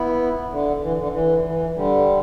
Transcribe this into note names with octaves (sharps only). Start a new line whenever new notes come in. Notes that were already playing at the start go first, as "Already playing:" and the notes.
Already playing: B3 E4
D3
E3
D3
E3
E3
D3 G3